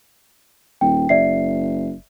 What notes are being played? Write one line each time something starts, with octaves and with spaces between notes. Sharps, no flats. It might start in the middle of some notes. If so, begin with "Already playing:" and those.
D#1 G5
F#1 D5 E5 C7